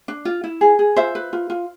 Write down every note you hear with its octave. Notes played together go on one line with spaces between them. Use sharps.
D4
F4
E4
G#4
G#4
F4 C5 E5
B4
F4
F4